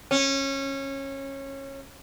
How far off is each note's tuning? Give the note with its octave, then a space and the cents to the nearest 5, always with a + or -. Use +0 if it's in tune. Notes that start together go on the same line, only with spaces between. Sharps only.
C#4 -20